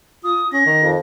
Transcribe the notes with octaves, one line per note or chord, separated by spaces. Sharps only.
F4 D#6
C#4 A#6
D#3
F2